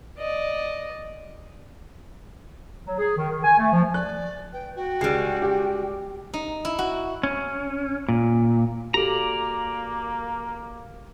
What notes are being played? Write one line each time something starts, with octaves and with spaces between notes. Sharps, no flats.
D5 D#5
F#3
G#4
D#3
D#3
G#5
A3
F3
D5 F#6
B4 G5
F#4 G5
C#2 G3 G#3 C7
G4
D#4
E4
F#4
C#4
A#2
A#3 F#4 G4 A4 D5 A#5